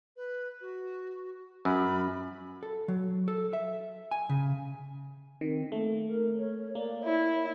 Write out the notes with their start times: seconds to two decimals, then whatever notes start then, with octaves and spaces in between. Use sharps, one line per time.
0.17 B4
0.61 F#4
1.65 F#2 B5
2.63 A4
2.88 F#3
3.28 A4
3.53 E5
4.11 G#5
4.29 C#3
5.41 D#3 C4
5.72 A3 A#3
6.07 A#4
6.38 C#5
6.75 A#3 D5
7.04 E4 C#5